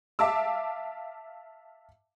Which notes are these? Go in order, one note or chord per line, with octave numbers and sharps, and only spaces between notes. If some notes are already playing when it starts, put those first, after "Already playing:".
E5 F5 A5 D6 E6